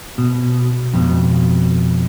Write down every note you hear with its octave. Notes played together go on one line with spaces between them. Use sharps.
B2
F2 B2